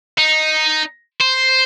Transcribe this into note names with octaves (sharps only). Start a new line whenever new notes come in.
D#4
C5